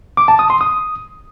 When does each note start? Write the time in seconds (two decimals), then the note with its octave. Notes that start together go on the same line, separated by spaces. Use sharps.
0.17 D6
0.28 A5
0.39 D#6
0.50 C6
0.61 D#6